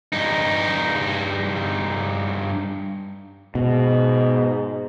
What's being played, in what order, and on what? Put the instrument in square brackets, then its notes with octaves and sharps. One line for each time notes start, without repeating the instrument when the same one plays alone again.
[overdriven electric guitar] G2 D#4
[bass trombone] G#2 [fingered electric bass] B2